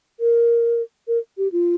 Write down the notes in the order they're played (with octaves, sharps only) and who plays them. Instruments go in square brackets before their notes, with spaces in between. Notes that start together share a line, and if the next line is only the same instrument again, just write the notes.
[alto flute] A#4
A#4
G4
F4